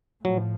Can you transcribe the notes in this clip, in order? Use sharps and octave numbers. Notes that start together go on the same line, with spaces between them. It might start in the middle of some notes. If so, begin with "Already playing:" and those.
A2 F3 F#3